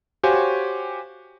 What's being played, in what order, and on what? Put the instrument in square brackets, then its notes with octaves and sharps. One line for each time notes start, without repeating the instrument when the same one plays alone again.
[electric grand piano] F#4 G4 C5 C#5 F5 G#5